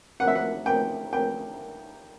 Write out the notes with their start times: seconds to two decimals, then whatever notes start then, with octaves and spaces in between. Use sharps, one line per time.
0.20 F#5
0.28 E5
0.35 F#5
0.66 G5
1.13 G5